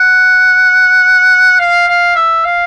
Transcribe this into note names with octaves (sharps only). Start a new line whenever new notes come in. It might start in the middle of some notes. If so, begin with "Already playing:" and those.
Already playing: F#5
F5
F5
E5
F5